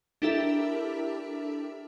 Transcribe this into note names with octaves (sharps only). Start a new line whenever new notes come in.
D4 E4 G4 A4 A#4 E5